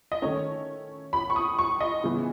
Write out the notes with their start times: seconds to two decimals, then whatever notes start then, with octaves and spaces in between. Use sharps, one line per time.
0.12 D#5
0.22 D#3 A3 C#4 C#5
1.13 B5
1.30 C#6
1.36 D#6
1.59 C#6
1.80 D#5
2.04 C#3 E3 B3